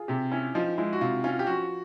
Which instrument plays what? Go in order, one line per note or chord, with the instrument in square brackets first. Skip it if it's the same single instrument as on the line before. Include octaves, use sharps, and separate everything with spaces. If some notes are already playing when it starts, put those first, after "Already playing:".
Already playing: [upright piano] F4 G#4
[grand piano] C3 [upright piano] G4
[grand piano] C#4 [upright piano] E4
[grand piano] F3 [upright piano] D#4
[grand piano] G#3 [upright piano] E4
[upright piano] F#4
[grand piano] C3 [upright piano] F4
[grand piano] C#4 [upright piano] F4
[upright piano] G4
[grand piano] F3 [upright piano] F#4